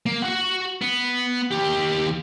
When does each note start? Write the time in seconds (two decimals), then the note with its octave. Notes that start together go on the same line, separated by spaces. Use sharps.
0.06 A#3
0.22 F#4 F#5
0.82 B3
1.51 D#2 G4